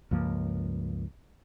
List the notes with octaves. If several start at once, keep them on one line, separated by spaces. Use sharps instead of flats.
C#2 G2 F3 A#3